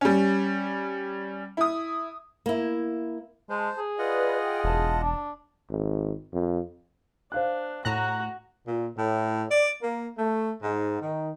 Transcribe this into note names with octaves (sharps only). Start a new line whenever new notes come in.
G3 C#4
E4 D#6
A#3 E4
G#3 C5 A5
G#4
F4 B4 D5 D#5 F#5
G5
E1 A5
D4
G#1
F2
D4 C5 F5 F#6
A2 F#4 A#5 F#6 A#6
A#2
A2
D5
A#3
A3
G#2
D#3